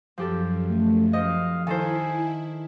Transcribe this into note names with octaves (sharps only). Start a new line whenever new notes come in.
F#2 F3 G4 A4
A3
F3 D#5 F5
D#3 E4 A4 C5 G#5